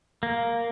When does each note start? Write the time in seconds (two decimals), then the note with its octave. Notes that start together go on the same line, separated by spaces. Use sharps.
0.23 A#3